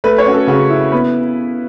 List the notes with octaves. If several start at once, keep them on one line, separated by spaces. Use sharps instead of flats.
A3 B4
C#5
C#4 F#4
A4
C#3 F#4
E4
B3 B4